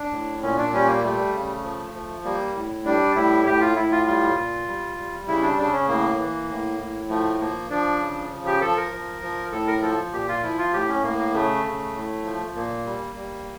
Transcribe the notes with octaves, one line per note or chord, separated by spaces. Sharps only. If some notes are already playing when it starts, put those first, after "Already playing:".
Already playing: D4
A2
A#2 C#4
D4
G3 C#4
A#3
G3 A3
C#3
F3
F3
G3 A#3
A2
G3 D4
A2 E4
A2 G4
F4
A2 E4
F4
G3 F4
A#2
G3
G3
C#3 E4
D4
C#3 D4
C#4
A2 A#3
E3
A2
A2
F3 A3
F3 A#3
F3 D4
C#3
F3
G4
F3 A4
A#4
F3
F3
A2 A4
A#4
F3 A4
A#2 G4
F4
F3 E4
F4
A2 G4
C#4
A2 A#3
A#3
C#3 A3
C#3
A2
F3
A#2 A#3
G3
G3